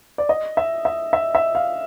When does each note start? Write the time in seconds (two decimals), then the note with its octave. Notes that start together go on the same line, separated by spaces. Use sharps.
0.18 D5
0.29 D#5
0.57 E5
0.85 E5
1.13 E5
1.35 E5
1.55 F5